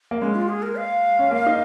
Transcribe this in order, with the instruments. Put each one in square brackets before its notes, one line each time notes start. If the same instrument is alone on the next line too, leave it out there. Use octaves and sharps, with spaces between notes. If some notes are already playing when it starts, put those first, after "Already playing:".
[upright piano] A#3
[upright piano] G#3 [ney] C#4
[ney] F4
G#4
A#4
F5
[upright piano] C#4
A#3
D#4